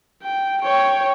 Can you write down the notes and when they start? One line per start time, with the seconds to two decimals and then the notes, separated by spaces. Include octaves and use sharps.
0.23 G5
0.62 C#5 G5